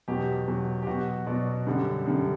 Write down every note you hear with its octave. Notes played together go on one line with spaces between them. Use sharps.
E2 B2 F#3 G4
E2 B2 F#3
G4
B2 F#3 F#4
B2 F#3 D5
F#2 D3 G3
F#2 D3 G3